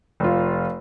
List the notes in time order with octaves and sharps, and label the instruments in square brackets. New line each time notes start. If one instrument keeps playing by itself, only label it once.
[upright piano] F1 F4